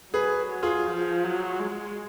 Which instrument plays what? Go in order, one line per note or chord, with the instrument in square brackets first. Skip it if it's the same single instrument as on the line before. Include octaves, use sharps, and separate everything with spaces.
[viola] F#3 [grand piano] G#4 B4
[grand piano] F4 G#4
[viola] F3
F#3
G#3